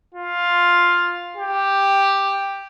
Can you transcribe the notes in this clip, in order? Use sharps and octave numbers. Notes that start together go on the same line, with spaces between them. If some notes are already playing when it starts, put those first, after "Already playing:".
F4
G4